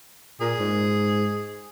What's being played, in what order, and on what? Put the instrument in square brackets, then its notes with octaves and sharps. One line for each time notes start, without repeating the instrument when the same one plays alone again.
[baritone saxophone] A#2 [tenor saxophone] G#4
[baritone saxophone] G#2